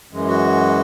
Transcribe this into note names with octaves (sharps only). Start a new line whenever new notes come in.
F#2 E3 G#3
F#4